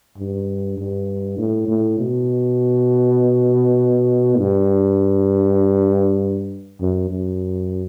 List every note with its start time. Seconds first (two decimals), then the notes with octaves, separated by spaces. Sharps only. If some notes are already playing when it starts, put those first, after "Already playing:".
0.18 G2
0.78 G2
1.38 A2
1.68 A2
1.99 B2
4.39 G2
6.81 F#2
7.10 F#2